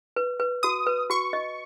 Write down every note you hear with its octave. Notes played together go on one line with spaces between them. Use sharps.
B4
B4
F#4 D#6
B4
F#4 C#6
D#5